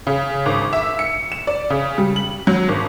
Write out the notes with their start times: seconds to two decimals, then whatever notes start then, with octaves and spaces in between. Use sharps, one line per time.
0.07 C#3
0.46 G#1
0.73 E5
0.99 C#7
1.32 E7
1.47 D5
1.70 C#3
1.98 G3
2.16 F#7
2.47 F#3
2.68 G#1